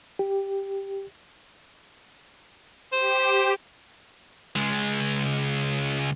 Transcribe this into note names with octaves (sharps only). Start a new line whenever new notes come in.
G4
G4 C5
C#2 G#3